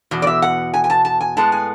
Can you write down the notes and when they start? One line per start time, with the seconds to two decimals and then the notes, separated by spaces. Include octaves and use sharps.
0.11 E2 B2
0.22 D5
0.27 E5
0.42 F#5
0.74 G#5
0.84 G#5
0.90 A5
1.05 A5
1.21 G#5
1.37 A2 G#3 B3 A5
1.52 G#5